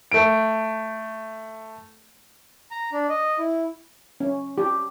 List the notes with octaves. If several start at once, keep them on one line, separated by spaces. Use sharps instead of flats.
A3 D7
A#5
D4
D#5
E4
C#4
G4